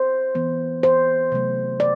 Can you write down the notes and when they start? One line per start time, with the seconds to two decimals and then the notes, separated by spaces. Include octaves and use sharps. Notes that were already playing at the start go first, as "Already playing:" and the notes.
Already playing: C5
0.35 E3 B3
0.83 C5
1.32 C3 F#3 A3
1.80 D5